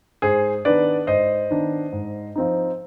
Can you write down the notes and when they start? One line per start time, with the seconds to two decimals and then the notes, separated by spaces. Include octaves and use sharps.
0.22 G#2 G#4 C5
0.65 D#3 B3 D4 B4 D5
1.07 G#2 C5 D#5
1.51 D#3 B3 D4
1.92 G#2
2.36 F3 C4 D#4